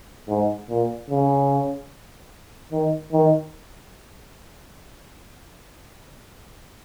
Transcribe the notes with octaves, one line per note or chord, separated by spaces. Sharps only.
G#2
A#2
C#3
D#3
D#3